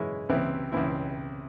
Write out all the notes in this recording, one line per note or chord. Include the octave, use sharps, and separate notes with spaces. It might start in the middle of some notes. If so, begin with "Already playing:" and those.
Already playing: F#2 E3 G#3 C#4 E4
C#2 C3 E3 C4 E4
C#2 C3 E3 C4 E4